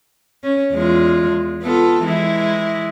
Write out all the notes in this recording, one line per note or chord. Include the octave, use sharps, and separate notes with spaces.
C#4
E2 G#3 F4
B3 F4 A4
E3 G#3 E4